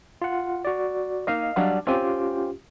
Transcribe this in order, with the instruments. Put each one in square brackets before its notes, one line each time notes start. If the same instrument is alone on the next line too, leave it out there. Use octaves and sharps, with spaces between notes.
[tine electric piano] F4 F#5
F#4 D5
[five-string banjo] A#3 D#4 [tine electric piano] D#5 F5
[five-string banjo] F#3 G3 D4
[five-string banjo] C4 G#5 [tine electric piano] C#4 F4 G4